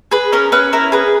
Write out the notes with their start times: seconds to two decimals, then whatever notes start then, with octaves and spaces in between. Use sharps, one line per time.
0.11 G#4 B4
0.32 C#4 A#4
0.52 C#4 B4
0.73 E4 A#4
0.92 G#4 B4